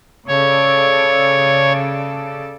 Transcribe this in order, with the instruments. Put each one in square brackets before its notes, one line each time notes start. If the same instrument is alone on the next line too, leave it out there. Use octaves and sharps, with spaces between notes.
[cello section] C#3 A4 D5 [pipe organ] C#5